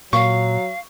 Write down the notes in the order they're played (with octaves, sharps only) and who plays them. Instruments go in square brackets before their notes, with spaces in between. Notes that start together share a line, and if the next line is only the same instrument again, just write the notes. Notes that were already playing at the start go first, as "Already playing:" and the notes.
[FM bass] A#2 [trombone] F#3 [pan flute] F5 [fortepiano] C#6